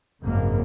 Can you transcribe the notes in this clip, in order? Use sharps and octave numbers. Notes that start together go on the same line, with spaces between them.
G#1 F#2 C#3 A#3